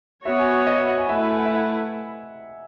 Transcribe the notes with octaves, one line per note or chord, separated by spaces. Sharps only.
B3 F#4 C#5 E5
G#5
F#5
D#5
E5
F#5
G#5
A3 E4 B4 E5
G#5
F#5
E5
F#5